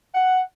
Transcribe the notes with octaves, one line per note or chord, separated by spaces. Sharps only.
F#5